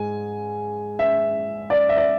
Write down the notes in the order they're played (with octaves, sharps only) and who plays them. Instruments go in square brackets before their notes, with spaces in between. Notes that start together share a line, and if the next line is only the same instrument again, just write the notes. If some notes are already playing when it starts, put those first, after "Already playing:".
Already playing: [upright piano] G#2 G#3 G#5
E5
D5
E5
D5